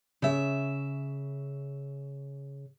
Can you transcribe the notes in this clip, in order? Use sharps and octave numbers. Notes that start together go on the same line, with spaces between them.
C#3 E5